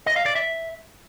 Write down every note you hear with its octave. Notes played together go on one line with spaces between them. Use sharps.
D#5
F5
D5
E5